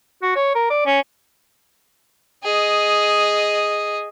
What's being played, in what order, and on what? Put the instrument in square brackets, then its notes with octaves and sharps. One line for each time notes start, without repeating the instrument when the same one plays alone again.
[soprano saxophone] F#4
C#5
A#4
D5
C#4
[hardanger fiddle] G#4 D#5